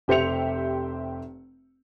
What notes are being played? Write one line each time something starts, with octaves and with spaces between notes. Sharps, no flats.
F1 G4 C5 E5 C#7 F7